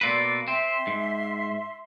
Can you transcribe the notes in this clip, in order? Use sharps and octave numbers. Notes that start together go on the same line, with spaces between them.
B2 A#3 B4 D5 C6 E6
C4 E5 C6
G#2